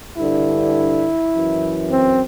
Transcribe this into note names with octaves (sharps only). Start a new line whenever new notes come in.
G2 D3 E4
F#2 E3
C4